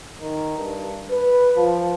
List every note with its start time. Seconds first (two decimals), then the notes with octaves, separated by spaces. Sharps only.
0.21 D#3
0.57 G2
1.10 B4
1.56 F3